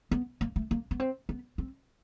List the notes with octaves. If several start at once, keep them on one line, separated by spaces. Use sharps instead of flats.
B3
A#3
A3
A#3
B3
C4
B3
C4